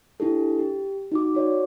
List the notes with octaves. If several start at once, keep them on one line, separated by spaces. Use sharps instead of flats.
D4 E4 G4 A4
G4
D#4 F#4 D6
F#4 C#5 D5